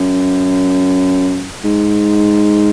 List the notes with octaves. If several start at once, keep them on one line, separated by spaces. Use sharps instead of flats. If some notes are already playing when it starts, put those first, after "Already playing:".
Already playing: F#2
G#2